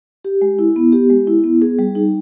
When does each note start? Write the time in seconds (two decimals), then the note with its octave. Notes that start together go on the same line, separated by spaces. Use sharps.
0.25 G4
0.42 G#3
0.59 E4
0.76 B3
0.92 G4
1.10 G#3
1.27 E4
1.44 B3
1.62 G#4
1.79 G3
1.95 D#4